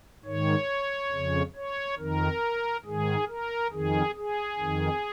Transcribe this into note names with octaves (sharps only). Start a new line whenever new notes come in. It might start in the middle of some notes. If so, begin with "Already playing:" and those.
G#2 D#3 C#5
F2 C#3
C#5
F2 D#3 A#4
G#2 D#3 G#4
A#4
F2 D#3 G#4
G#4
F2 D#3